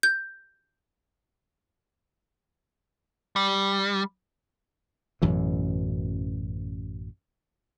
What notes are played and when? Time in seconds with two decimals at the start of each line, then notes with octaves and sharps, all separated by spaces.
0.03 G6
3.36 G3
5.22 A1 F#2 B2 E3